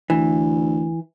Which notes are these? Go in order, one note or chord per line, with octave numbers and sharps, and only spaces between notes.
D2 E3